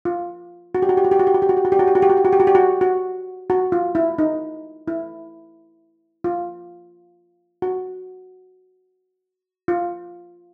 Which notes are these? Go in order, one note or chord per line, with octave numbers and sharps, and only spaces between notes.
F4
F#4
G4
F#4
G4
F#4
G4
F#4
G4
F#4
G4
F#4
G4
F#4
G4
F#4
G4
F#4
G4
F#4
G4
F#4
G4
F#4
G4
F#4
F#4
F#4
F4
E4
D#4
E4
F4
F#4
F4